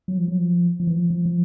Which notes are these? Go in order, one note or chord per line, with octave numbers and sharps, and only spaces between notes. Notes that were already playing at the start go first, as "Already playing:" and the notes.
F#3
F3
F#3
F3
F3
E3
F3
F3
F3